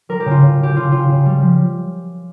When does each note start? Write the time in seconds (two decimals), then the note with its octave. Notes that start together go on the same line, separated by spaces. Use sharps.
0.09 G3 A#4
0.20 G4
0.26 C#3
0.31 F4
0.42 C#3
0.60 C#3 G4
0.75 C#3 F4
0.91 C#3 F4
1.09 C#3
1.26 G3
1.42 F3